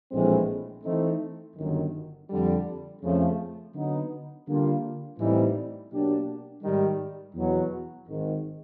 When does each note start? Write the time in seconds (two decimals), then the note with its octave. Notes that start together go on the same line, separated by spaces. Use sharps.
0.11 A#1 A2 E3 G#3 C4
0.84 E3 A3 C4 D#4
1.56 G1 F#2 D#3
2.28 F2 D3 G3
3.01 F2 C#3 F3 A3 C#4
3.73 D3 F#3 B3 D#4
4.46 D3 G3 A#3 D4 F4
5.18 A2 E3 G3 C4 D#4
5.90 B2 F#3 A#3 D4 G4
6.62 G#2 D#3 G3
7.34 E2 B2 F#3 B3
8.07 G#1 G#2 D#3